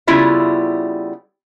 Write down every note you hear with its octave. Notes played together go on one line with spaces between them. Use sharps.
C#3 G3 B3 E4 F4 E5